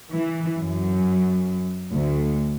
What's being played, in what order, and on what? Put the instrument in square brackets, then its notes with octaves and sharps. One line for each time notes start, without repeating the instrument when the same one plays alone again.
[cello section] E3
F#2
D2